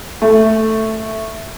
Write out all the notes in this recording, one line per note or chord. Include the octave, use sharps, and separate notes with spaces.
A3